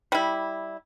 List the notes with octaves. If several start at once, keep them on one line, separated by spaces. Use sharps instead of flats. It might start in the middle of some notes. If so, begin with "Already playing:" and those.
G3 E4